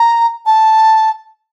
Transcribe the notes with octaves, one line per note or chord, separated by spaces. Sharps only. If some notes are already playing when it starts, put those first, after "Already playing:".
Already playing: A#5
A5